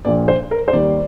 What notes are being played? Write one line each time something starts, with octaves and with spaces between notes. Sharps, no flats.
A#1 A#2 F3 D5
C5
A#4
C5
D#2 D#3 G3 D5